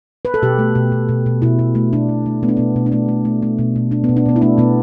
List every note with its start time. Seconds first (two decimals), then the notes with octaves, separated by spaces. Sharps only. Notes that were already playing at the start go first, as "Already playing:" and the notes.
0.25 B4
0.34 A4
0.42 B2 G4
0.59 A3
0.75 B2
0.92 B2
1.09 B2
1.26 B2
1.42 B2 E4
1.59 B2
1.75 A3
1.93 B2 D4
2.09 B2
2.26 A3
2.43 A3 B3
2.49 D4
2.57 B2 B3
2.76 B2
2.86 D4
2.92 A3 B3
3.08 A3
3.25 A3
3.42 A3
3.59 B2
3.76 B2
3.91 B2 D4
4.04 B2 B3
4.17 D4
4.26 B2 B3
4.36 E4
4.42 A3 D4
4.58 B2 B3